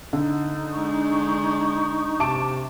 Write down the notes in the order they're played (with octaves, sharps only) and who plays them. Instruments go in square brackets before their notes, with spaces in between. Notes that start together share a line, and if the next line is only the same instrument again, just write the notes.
[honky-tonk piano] D3 [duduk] D#4
[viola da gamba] G#3 D4 [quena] C#6
[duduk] C3 [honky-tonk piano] A5 D6 D7